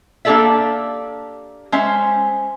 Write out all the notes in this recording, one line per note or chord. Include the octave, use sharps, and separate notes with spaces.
A#3 D4 G4 A4 D5 E5
G#3 C#4 C5 E5